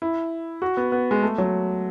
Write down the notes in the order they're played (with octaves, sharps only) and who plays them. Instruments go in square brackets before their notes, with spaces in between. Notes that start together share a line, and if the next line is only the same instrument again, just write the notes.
[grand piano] E4
F#4
B3
B3
G#3
A3
F#3